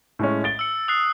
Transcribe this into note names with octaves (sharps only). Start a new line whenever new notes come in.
A2 G#3 C#4
A6 D7 G7
E6 C#7
D#6 F#6 C7